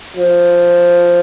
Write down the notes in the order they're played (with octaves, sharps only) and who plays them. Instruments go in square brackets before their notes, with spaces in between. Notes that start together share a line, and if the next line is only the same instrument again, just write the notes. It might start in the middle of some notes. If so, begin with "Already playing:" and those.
[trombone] F3